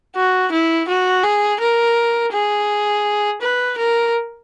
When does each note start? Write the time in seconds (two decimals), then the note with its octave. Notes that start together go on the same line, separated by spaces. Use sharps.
0.16 F#4
0.52 E4
0.88 F#4
1.24 G#4
1.61 A#4
2.33 G#4
3.42 B4
3.78 A#4